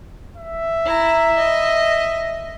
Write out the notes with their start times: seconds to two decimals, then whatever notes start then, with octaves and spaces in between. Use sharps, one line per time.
0.37 E5
0.85 E4 A#5
1.37 D#5